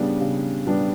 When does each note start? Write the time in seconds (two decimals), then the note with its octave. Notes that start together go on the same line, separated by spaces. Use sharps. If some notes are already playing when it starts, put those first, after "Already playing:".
Already playing: C#3 G3 B3 D4
0.21 C#3
0.67 G3 B3 D4